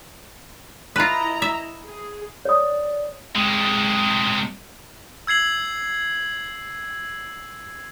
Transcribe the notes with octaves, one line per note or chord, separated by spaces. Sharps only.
E4 F4 B4 D#5 A#5 B5
E5
G#4
C#5 D5 D#6
C3 G#3
E6 G#6 C7 F#7